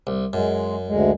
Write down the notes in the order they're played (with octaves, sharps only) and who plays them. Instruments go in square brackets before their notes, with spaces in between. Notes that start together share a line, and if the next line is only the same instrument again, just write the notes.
[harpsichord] C2
[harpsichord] F#2 [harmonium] G#3
[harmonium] D2 G#3